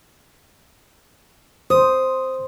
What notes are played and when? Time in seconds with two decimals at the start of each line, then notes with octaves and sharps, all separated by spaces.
1.70 C5 D#6